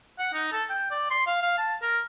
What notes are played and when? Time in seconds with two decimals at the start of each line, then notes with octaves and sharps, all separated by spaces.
0.19 F#5
0.33 D#4
0.52 A4
0.69 G5
0.91 D5
1.10 C6
1.26 F5
1.42 F5
1.58 A5
1.82 A#4